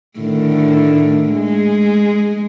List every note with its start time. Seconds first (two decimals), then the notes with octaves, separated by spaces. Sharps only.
0.19 A2 D3 D#3
1.34 G#3